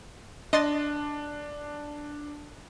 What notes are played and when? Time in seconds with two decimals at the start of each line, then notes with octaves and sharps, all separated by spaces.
0.53 D4 D#5 C6 A6